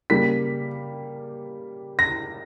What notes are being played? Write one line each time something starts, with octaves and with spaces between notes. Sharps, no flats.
C#3 G3 A#3 B6
A#6